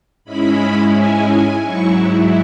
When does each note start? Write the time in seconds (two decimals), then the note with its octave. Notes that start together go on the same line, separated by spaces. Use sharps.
0.25 G#2 G#3 C#4 E4 B5
0.94 G#5
1.28 G#5
1.62 G#2 F#3 E4 C#6